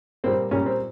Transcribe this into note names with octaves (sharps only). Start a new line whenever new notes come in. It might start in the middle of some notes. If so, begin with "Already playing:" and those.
A#2 G3 A#3 C4
A#2 G3 A#3 C#4
C4